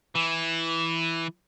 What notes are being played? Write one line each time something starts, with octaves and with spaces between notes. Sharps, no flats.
E3